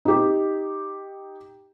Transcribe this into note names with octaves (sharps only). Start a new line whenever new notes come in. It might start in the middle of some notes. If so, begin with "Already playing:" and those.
D#4 G4